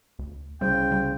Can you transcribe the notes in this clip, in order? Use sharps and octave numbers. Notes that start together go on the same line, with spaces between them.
D2
C2 C#3 G3 C5 G5
G3